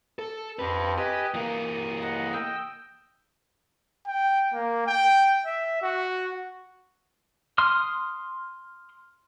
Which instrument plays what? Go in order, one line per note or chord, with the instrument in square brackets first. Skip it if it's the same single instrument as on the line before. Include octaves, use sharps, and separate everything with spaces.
[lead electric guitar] A4
[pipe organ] F2 [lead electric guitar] G4 B4
[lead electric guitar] G4 [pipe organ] B4 D#5 G#5
[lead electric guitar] E3 A#3 [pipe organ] D#6
[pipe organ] D#5 F#5
D#5 G5 E6
[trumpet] G5
A#3
G5
E5
F#4
[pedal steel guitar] C6 D#6 F6